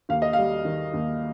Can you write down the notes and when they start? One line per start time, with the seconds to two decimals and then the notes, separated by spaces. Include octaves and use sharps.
0.09 D#2 F5
0.22 D#5
0.33 G3 F5
0.65 D#3
0.93 D#2